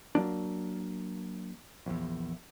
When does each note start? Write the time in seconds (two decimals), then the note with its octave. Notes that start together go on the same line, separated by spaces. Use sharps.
0.15 F#3 A#3 D4
1.86 A#1 E2